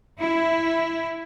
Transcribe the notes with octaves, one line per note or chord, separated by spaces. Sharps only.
E4